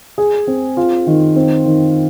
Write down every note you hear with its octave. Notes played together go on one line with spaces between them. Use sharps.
G#4
C4
F4
D#3
C4
D#3